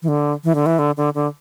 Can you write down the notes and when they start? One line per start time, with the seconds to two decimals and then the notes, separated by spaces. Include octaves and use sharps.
0.02 E3
0.08 D3
0.44 E3
0.55 D3
0.66 E3
0.79 D3
0.97 D3
1.15 D3